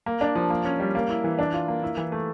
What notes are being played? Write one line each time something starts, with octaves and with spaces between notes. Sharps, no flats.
A#3
D4
F3
A#3
C#4
G3
A#3
E4
E3
D4
F4
A#3
E4
E3
A3